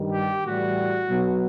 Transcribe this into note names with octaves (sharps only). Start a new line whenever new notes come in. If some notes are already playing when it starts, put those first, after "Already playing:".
Already playing: G2 D#3 G3
G4
A2 E3 G3 F#4
B2 F#3